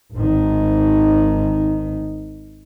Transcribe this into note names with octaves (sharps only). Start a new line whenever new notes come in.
G#1 D#3